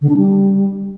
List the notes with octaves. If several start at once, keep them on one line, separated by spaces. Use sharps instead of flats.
D3
D4
G3